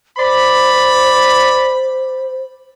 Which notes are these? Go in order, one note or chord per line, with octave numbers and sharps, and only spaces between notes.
C5 D5 B5